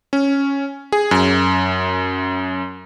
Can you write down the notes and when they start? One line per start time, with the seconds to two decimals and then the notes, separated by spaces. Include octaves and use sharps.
0.13 C#4
0.92 G#4
1.11 F#2